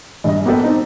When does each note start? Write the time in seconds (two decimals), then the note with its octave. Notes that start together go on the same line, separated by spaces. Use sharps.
0.24 A#1 G2 D#5
0.45 A#3 B3 F#4 G4 A4 B4
0.64 C4 D#4